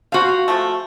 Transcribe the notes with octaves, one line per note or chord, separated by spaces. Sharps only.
F3 F4 F#4 C5 F5
F3 G#3 A3